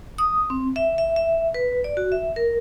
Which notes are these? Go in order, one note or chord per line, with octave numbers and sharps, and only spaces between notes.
D#6
C4
E5
E5
E5
B4
D5
F#4
E5
A#4